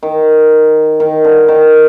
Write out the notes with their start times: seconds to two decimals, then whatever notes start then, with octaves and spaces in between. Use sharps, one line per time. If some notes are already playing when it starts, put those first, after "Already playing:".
0.03 D#3
1.00 D#3
1.24 D3
1.48 D#3